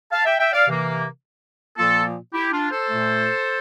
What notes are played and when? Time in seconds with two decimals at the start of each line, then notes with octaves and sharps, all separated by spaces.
0.12 F5 A5
0.25 E5 G5
0.39 E5 G5
0.53 D5 F5
0.67 C3 E3 A#3
1.78 A#2 F3 A#3 F4 A4
2.34 E4 G4
2.53 D4 F4
2.71 A4 C5
2.89 A#2 A3